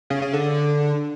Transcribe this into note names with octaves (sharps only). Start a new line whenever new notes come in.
C#3
C#3
D3